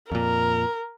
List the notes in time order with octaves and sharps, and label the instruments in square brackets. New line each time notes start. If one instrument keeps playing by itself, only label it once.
[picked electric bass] F2 A#2 [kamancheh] A#4